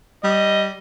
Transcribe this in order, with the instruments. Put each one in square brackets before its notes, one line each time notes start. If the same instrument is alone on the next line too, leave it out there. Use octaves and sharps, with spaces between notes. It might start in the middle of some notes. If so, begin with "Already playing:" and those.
[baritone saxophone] G3 [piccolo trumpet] D#5